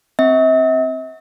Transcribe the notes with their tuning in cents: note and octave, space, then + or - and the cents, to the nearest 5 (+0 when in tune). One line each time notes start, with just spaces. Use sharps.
C4 +5 E5 -45